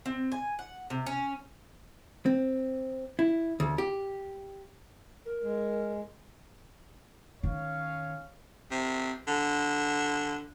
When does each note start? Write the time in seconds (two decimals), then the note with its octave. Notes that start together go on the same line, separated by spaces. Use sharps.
0.06 C4
0.32 G#5
0.59 F#5
0.90 C3
1.06 C#4
2.26 C4
3.19 E4
3.60 D2
3.78 G4
5.25 A#4
5.42 G#3
7.43 D#3 C#4 C#5 F5
8.71 C3
9.27 D3